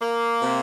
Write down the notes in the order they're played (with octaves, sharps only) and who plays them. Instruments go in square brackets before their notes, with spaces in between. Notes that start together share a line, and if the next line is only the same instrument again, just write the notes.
[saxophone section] A#3
C3